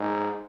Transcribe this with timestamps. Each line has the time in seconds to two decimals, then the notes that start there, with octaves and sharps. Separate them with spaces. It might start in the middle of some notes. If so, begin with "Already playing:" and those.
Already playing: G#2